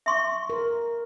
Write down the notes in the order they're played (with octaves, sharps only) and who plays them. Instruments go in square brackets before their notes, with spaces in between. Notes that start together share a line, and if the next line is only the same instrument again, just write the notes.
[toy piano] E5 C6 C#6
[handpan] A#4